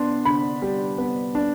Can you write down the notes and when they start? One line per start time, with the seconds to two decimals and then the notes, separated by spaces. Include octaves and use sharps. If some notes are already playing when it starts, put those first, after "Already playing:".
Already playing: B3 D4 C6
0.25 D3 B5
0.62 G3
0.98 B3
1.35 D4